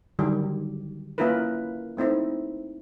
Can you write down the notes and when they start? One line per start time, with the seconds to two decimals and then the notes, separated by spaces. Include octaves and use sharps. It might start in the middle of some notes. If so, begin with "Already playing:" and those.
0.19 D3 D#3 F#3 G3 G4
1.18 A#3 C#4 E4 F4 A#4 B4
1.97 A3 C4 D#4 E4